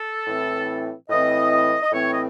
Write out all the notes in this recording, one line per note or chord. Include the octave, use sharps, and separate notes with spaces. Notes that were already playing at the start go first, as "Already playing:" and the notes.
Already playing: A4
A2 E3 C4
A2 E3 C4 D#5
D#5
A2 E3 C4 C#5
D#5